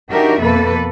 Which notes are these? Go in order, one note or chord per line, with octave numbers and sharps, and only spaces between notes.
D4 D#4 F#4 G4 A#4 E5
F2 B2 A#3 A4 B4